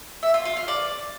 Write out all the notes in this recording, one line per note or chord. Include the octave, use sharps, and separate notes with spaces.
E5
F4
F4
F5
D5